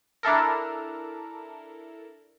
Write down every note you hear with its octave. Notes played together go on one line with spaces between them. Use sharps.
D4 E4 A4 A#4